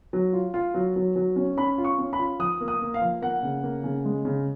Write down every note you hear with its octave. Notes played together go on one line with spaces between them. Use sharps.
F#3
F4
F4
F#3
F#3
F#3
C#4
C#4 B5
F4
C#6
C#4
B5
F4
F3 D#6
A#3
D#6
A#3
F5
F3
A#3 F#5
C#3
A#3
C#3
G#3
C#3